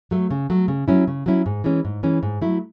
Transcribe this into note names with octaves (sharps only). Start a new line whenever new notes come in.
F#3 A3
C#3
F#3 A3
C#3
F#3 C#4 E4
C#3
F#3 C#4 E4
G#2
E3 G#3 C#4
G#2
E3 G#3 C#4
G#2
F#3 A3 E4